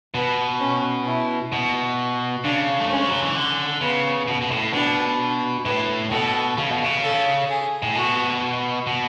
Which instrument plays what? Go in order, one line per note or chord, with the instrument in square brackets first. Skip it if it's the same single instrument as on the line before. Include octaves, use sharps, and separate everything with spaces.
[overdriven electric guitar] B2 [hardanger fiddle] B3
[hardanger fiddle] C#4
E4
[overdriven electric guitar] B2
[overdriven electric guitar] C#3 [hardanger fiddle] D4
[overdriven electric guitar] A3
[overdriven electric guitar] G#3 [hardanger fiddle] C#4
[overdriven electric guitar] F#3
E3
D3
[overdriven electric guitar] C#3 [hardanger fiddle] B3
[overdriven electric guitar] B2
B2
A2
[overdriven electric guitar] B2 [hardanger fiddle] D4
[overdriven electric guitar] A2 [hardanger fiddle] B4
[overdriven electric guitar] B2 [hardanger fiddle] A4
[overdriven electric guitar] C#3
B2
C#3
[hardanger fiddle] A4
G#4
[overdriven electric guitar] A2
[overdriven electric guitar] B2 [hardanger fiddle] F#4
[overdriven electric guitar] B2